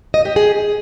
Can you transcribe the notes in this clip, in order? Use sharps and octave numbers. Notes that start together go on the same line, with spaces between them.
D#5
G4
G#4